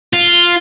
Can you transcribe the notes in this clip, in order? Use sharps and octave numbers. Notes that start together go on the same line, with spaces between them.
F4